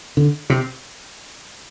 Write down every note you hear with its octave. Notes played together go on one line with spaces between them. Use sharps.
D3
C3